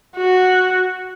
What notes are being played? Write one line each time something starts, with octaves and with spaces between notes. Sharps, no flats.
F#4